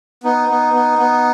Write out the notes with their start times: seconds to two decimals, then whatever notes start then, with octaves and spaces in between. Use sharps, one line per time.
0.24 B3 D#4
0.49 B3
0.74 B3
0.99 B3